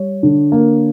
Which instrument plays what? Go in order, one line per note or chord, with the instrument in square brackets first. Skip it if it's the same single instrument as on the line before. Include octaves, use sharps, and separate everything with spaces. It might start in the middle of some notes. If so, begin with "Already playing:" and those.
Already playing: [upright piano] G3 C#5
D3
A#3